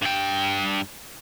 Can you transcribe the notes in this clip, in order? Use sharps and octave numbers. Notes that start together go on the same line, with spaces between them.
G2 G5